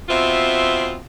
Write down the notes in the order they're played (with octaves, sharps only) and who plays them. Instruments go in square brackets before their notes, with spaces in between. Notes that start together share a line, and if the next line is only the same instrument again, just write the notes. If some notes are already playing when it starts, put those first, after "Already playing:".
[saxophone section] B2 C4 F4 E5